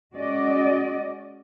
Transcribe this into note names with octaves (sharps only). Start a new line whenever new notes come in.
G#3 C#4 F#4 D5 D#5